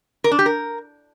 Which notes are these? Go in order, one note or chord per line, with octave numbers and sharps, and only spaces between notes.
A#4
D4
G4
A#4